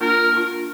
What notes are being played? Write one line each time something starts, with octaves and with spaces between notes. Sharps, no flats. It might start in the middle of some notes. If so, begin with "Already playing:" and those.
A#3 D4 F4 A#4
A#3 D4 F4